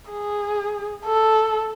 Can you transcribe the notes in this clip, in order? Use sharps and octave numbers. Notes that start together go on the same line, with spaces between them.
G#4
A4